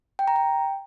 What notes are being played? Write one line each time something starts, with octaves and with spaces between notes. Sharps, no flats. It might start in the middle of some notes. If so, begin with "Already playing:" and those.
G5
A#5
G5